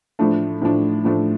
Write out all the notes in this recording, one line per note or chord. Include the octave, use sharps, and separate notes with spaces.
A2 F3 A3 D4
A2 F3 A3 D4
A2 F3 A3 D4